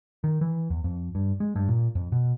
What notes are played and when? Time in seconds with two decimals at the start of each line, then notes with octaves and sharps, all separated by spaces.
0.24 D#3
0.41 E3
0.70 E2
0.84 F2
1.15 G2
1.40 G#3
1.56 G2
1.69 A#2
1.95 F2
2.12 B2